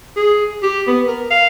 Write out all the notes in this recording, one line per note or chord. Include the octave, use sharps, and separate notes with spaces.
G#4
G4
B3
A#4
F5